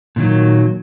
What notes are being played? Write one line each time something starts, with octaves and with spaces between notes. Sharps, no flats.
A#2 D#3 F#3